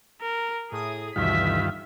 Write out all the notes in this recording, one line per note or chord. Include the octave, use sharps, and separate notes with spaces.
A#4
A2 G#4 D#6
D2 G2 B2 D#3 E3 F4 E5 B6